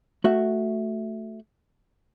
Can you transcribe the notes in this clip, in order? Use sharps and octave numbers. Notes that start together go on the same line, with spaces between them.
A3 F#4 E5